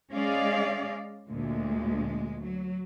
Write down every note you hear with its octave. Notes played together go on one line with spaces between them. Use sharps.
G#3 C#4 G#4 D5 D#5 F5
D2 A#2 G#3
F#3